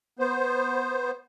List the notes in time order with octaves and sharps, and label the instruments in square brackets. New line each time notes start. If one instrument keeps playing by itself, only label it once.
[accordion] B3 C5